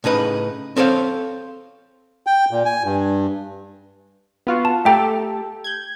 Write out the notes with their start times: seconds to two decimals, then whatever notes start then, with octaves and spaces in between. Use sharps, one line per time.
0.04 A2 C#3 D#4 B4
0.77 C4 A4 C5 C#5 F5
2.26 G5
2.51 A#2
2.65 G#5
2.84 G2
4.47 B3 F4 F#4
4.65 A5
4.85 A3 G4 A4 E5 G5 A#5
5.64 G6 G#6